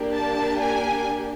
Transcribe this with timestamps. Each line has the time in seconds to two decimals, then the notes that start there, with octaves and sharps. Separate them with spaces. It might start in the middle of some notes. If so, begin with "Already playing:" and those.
Already playing: A#3 D4 G4
0.13 A5
0.61 G#5